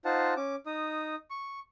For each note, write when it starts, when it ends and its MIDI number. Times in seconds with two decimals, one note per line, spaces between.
0.05 0.34 63
0.05 0.34 65
0.05 0.34 72
0.05 0.34 78
0.05 0.34 81
0.37 0.55 61
0.37 0.55 86
0.66 1.15 63
0.66 1.15 87
1.30 1.60 85